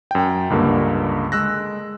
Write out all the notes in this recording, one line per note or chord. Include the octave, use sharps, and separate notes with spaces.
F#2 G5
C#2 G2 D3 A#3
G#3 E6 F#6 A#6